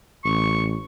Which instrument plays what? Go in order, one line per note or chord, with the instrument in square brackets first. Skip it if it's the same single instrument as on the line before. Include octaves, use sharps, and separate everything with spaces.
[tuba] A1 [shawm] C#6